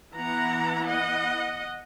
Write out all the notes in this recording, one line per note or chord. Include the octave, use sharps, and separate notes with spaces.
E3 B3 E4 F#5 A#5
D#5 F#5